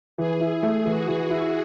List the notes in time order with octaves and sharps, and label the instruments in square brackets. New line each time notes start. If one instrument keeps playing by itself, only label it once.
[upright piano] E3 [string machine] G#4
[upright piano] E4
A3
[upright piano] E3 [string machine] F#4
[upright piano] E3
E4